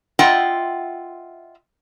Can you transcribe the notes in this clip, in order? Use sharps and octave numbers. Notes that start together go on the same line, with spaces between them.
F4 D#5 E5 F#5 G5